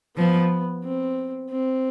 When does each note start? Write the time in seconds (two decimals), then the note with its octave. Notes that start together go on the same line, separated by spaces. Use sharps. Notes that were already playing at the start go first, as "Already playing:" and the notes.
0.16 F3 B3
0.84 C4
1.50 C4